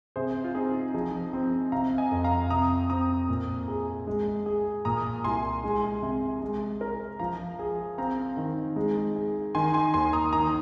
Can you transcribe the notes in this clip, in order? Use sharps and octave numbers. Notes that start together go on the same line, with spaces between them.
C3 G#4 C5
F4
C4 D#4 G#4
F3 D#4 G#4
C4
C3 F5 A#5
D#5 G#5
F2
F5 A#5
C3 A#5 D#6
C4 A#5 D#6
A#2
G#4
G#3
G#4
A#2 A#5 D#6
C2 G#5 C6
G#3
C3
G#3
A#4
F3 F5 A#5
G#4
C4 F5 A#5
D#3
G#3
G#4
D#3 G#5 C6
G#5 C6
D#2 G#5 C6
A#5 D#6
D#3 A#5 D#6